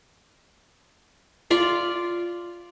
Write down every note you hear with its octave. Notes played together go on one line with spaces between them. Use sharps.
F4 D5 F5